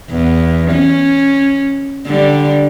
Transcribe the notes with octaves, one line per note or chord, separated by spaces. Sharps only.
E2
C#4
D3 G3